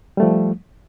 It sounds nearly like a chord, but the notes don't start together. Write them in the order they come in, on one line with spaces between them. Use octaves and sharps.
G3 A3 F3